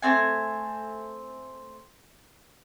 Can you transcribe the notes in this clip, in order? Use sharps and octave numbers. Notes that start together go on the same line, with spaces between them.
A3 C4 G#5